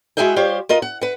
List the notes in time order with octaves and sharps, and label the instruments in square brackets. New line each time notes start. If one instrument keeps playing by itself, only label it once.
[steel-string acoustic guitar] G#3 E4 F#4 G#4 E5 G5
G3 F4 G4 C5 C#5 F5
F4 A#4 D#5
F#5
B4 F#5